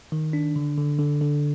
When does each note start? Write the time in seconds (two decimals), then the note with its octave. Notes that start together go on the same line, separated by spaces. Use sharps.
0.12 D#3
0.33 D4
0.56 D3
0.78 D3
0.99 D3
1.21 D3